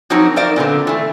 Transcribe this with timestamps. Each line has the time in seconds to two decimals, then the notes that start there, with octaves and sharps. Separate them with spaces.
0.10 F3 F#3 A#3 C4 D#4 F#4
0.36 A#4 C5 D5 F5
0.56 A#2 D3 B3 C4
0.87 E3 A3